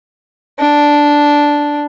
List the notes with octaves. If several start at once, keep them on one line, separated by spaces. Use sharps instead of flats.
D4